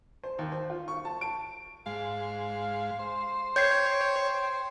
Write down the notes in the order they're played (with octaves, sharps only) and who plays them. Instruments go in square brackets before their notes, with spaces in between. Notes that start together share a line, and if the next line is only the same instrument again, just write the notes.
[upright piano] C5
D#2
C5
F4
C#6
A5
D7
[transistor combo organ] G#2 [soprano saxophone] F5
[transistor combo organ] C5
[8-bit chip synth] C#5 [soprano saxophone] G5 [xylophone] G6 G#6 C7